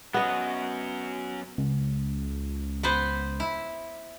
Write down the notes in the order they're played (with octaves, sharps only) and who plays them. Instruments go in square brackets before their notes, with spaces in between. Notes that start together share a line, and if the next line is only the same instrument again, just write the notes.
[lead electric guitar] F#3 C#4 [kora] B3 D#5
[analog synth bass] C#2
[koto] B3 B4 C5
E4